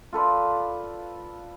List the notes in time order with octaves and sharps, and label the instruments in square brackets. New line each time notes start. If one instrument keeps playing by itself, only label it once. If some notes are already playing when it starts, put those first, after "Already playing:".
[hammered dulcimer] F4 A4 B4 D5